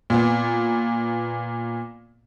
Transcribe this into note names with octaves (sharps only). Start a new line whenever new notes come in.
A#2 B3